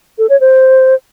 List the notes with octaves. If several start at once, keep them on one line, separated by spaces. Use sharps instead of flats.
A4
C#5
C5